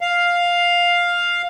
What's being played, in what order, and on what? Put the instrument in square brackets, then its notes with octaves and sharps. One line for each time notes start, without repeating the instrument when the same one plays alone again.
[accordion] F5